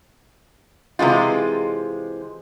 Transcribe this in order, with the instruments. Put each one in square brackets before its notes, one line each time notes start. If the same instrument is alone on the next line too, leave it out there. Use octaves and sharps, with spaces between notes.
[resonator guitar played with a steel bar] C3 E3 G#3 F4